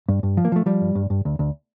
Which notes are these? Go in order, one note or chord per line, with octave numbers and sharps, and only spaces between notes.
G2
G2
F3
A#3
F3 A3
F3 G3
G2
G2
G2
D2
D2